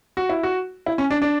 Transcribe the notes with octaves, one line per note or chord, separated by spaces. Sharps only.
F#4
E4
F#4
E4
C#4
D4
D4